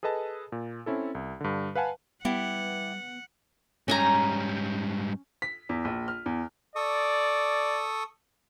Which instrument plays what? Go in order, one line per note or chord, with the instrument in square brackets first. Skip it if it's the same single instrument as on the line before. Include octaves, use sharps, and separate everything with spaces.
[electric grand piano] G#4 A4 B4 D#5 A5
A#2
C4 C#4 E4 A4
C2
G2 D3
B4 F5 F#5 G#5 A5
[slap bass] G3 [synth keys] B3 [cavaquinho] E4 G4 [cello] F#5
[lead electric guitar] G#2 G3 [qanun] C#4 G#5 A#5
[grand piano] B6
E2
A#1
F6
E2
[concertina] A4 C#6 D#6 [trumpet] D5